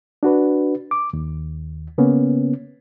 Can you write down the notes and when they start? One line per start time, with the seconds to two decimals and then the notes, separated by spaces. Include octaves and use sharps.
0.23 D4 F#4 B4
0.91 D6
1.13 D#2
1.98 C#3 A#3 B3 C#4